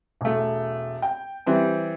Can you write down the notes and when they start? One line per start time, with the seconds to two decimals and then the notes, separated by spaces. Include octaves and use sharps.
0.21 E1 A3
1.02 G5
1.46 E3 G3 C4